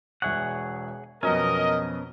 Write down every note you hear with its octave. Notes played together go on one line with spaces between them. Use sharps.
E1 G#4 C#5 E5 F#5 C#6
F2 B2 F#3 B3 C#4 A#4 D#5